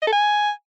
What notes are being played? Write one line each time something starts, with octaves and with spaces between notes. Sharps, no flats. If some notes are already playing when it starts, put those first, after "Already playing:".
D#5
A4
G#5